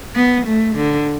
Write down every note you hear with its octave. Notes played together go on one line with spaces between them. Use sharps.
B3
A3
D3